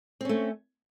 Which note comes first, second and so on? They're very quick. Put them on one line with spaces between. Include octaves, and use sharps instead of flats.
C4 C#4 A3